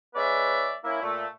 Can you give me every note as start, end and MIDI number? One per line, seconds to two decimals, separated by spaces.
0.15 0.73 56
0.15 0.73 61
0.15 0.73 71
0.15 0.73 74
0.15 0.73 76
0.84 1.01 58
0.84 1.01 61
0.84 1.01 64
1.02 1.26 46
1.02 1.26 57